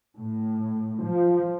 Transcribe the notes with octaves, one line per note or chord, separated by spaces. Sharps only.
A2
F3